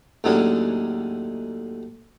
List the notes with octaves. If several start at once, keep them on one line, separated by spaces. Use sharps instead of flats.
D#2 A2 F#3 G#3 C#4 D4